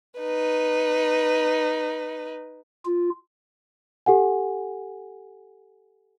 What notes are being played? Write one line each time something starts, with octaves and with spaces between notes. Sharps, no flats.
D#4 B4
F4
G4 A4 F#5 G#5